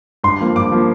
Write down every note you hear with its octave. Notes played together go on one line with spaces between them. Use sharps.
G2 C6
F3 A#3
G2 D6
F3 A#3